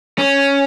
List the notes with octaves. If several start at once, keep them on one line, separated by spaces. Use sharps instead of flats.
C#4